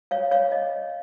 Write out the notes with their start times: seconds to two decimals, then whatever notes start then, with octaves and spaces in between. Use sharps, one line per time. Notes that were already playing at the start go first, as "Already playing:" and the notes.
0.11 C#5 F5
0.31 C#5 F5
0.52 D#5